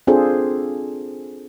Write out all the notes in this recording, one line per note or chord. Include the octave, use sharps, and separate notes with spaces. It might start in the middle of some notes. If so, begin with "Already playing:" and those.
C4 D4 F4 G#4 A4 C5